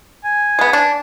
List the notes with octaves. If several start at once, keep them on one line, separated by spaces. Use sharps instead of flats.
G#5
G#3 B3
D4